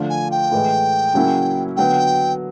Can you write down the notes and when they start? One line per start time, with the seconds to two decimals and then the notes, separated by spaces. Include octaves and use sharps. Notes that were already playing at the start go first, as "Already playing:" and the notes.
Already playing: D3 F3 A3 D4 F4
0.10 G#5
0.31 G5
0.51 A2 E3 G#3
1.14 C#3 F#3 A#3 C#4 E4
1.77 D3 F#3 B3 G5